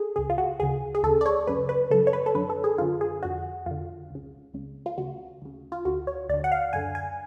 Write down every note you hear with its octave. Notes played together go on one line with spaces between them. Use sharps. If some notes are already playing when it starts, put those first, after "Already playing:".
Already playing: G#4 A4
C#2 C#3 G#4
F4
F#4
D2 C#3 G#4
G#4
D2 C#3 A4
D5
C#5
F#2 C#3 B4
B4
F#2 C#3 A4
C#5
B4
A4
F#2 D3 B4
A4
G#4
F#2 D3 F4
G#4
F2 D3 F#4
F2 D3 F4
C#2 C#3
C#2 C#3
F4
D2 C#3 F#4
D2 C#3
F4
D2 D3 F#4
C#5
D2 D3 D5
F#5
F5
F#2 D3 G#5
G#5